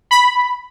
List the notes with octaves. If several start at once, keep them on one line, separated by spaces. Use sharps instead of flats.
B5